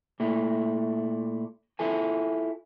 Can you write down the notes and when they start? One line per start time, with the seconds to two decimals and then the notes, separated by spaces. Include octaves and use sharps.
0.20 A#2 A3 E4
1.79 E4 F4 A4 G#5